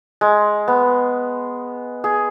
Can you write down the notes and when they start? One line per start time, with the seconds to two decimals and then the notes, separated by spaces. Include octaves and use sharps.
0.21 G#3
0.68 B3
2.04 G#4